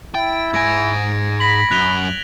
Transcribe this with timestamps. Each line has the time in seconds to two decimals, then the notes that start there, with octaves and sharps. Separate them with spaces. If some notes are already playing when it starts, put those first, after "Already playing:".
0.14 E4 G5 A6
0.53 G#2 G#5 G#6 A#6 D7
1.40 B5 A#6 B6 F#7
1.71 F#2 F#6 F7 G7